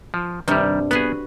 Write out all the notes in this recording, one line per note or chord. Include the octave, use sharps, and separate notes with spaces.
F3
G2 C3 D#3 G3
B3 F#4 G#4 B4